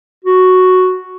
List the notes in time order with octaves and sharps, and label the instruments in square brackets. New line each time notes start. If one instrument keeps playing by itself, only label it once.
[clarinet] F#4